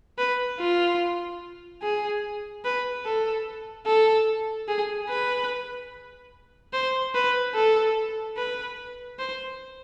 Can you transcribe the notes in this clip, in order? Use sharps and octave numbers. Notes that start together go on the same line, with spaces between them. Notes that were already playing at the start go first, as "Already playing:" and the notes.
B4
F4
G#4
B4
A4
A4
G#4
B4
C5
B4
A4
B4
C5